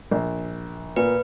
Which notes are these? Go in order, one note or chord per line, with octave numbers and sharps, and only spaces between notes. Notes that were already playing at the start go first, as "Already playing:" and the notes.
A#1
A#2 B4